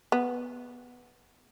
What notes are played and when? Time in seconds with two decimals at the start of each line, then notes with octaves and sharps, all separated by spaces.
0.12 B3